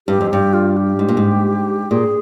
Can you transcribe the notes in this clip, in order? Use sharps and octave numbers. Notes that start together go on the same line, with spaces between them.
G2 G4
F2
G2 G4
F4
G4
G#2
A#2
G#2
A#2 G#4